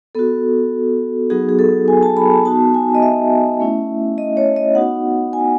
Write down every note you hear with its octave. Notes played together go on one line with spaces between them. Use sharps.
B3 F#4 A4
F#3 B3 D#4 F#4 G#4
G#4
A4
G#5
A5
B5
A5
B3 D#4 F#4 A5
G#5
D#5
E5
A3 C#4 E4
D#5
C#5
D#5
B3 D#4 F#4 F#5
G#5